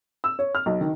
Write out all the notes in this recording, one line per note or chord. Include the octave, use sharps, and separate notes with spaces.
E6
C#5
F6
B1
D#3